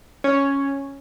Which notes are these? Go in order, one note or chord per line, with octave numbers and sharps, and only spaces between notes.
C#4